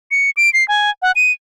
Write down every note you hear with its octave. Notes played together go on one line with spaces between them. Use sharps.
C#7
D7
C7
G#5
F#5
D#7